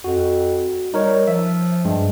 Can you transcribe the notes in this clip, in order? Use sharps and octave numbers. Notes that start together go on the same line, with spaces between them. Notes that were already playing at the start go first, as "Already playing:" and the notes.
F2 F#4
G3 D#4 A#4 C#5
F3 E5
G2 G#3